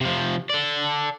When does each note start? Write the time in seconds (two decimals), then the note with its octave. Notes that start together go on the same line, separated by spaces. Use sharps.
0.01 C3 F3
0.50 A4 D5